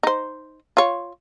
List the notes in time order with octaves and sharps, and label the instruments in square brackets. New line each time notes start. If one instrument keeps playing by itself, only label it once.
[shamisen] D#4 C5
F4 C#5